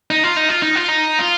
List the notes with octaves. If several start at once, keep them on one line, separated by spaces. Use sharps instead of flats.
D#4
F4
D#4
F4
D#4
F4
D#4
F4